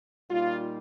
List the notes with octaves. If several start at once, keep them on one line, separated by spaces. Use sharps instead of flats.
A#2 G3 D#4 F4